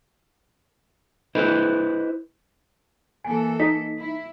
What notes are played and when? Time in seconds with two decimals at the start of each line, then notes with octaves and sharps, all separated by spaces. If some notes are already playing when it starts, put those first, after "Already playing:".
1.35 E4 B4 C5 D#5
3.24 E3 A#3 A4 G#5
3.60 D#4 B6
3.99 E4